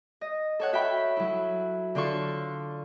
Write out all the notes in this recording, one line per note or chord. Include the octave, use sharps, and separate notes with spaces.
D#5
A4 C#5 F#5
F#4 E5 G5 B5
F#3 E4
D3 D4 F4 A4 C#6